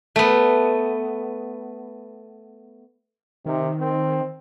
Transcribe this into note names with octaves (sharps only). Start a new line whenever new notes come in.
A3 B3
C3 D#3
C4